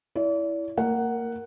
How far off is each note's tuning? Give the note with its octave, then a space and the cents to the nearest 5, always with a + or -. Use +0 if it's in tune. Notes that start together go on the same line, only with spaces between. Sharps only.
E4 +0 D5 -40
A#3 -30 A#4 +0 F#5 +5